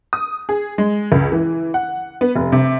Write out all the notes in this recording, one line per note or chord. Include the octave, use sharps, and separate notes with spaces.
D#6
G#4
G#3
C#2
E3
F#5
B3
F1
C3